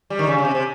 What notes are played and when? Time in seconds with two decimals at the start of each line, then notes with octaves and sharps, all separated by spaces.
0.10 G3
0.19 D#3
0.27 C#3
0.38 C#3
0.45 C3
0.55 C3